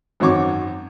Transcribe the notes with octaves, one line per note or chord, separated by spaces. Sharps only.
G#1 F#2 C4 C#5 C#6 D6